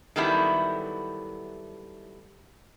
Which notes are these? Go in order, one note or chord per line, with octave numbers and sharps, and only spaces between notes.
D#3 F#3 G3 A3 B3 E4